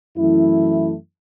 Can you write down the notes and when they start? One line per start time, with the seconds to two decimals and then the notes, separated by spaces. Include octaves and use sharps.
0.17 F#2 E3 A3 E4